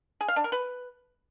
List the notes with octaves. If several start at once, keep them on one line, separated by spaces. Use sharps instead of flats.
G#4
F5
D4
A#4
B4